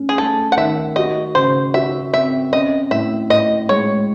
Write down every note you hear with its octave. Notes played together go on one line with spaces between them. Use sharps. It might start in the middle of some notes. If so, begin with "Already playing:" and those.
Already playing: A3 C#4
G#4
A3 A4
F#5
D#3 E5
F#4 D#5
C#3 C5
F#4 E5
C4 E5
C#4 D#5
A2 E5
A2 D#5
G#3 C#5